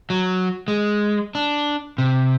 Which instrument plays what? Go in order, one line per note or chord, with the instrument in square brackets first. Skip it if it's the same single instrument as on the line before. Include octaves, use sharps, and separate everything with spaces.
[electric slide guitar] F#3
G#3
D4
C3